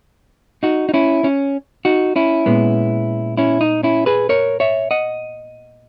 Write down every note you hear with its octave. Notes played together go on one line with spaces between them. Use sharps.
D#4 F#4
D#4
C#4 E4
C#4
D#4 F#4
C#4 E4
A#2 G#3 B3
C#4 E4
D#4
C#4 E4
G#4 B4
A#4 C#5
C#5 E5
D#5 F#5